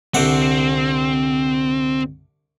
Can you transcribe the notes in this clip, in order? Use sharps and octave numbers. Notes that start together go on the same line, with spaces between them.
C2 D3 C4 F#5